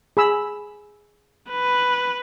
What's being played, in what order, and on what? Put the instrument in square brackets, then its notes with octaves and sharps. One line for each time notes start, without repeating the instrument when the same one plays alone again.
[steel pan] G#4 B5 E6
[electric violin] B4